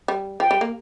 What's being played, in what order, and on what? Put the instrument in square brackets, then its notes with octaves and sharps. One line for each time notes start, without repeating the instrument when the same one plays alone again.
[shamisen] G3
[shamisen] F3 [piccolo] G5
[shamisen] G3
A#3